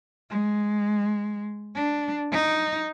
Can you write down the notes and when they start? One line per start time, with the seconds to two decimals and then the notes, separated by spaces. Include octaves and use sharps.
0.30 G#3
1.75 D4
2.32 D#4